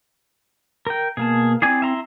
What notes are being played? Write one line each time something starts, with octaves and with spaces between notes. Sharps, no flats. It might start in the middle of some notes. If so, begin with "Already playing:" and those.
A#4 G5
B2 A#3 G#4 A5
C4 E4 G#4 D5 G#5
E5 A#5 C6